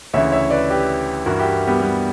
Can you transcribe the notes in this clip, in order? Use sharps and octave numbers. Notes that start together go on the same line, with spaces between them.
D2 C#3 E3 C#5 E5
C#5 E5
B4 D5
G4 B4
G2 E3 F#4 A#4
E4 G4
G3 B3
G3 B3